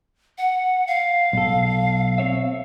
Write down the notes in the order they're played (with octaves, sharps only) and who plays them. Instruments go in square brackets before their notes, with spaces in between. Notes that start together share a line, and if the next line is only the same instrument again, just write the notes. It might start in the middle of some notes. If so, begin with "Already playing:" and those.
[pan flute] F#5
F5
[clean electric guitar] B1 A4
C4 C#5 E5